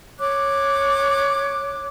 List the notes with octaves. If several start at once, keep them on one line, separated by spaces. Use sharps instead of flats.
C#5 D6 F#6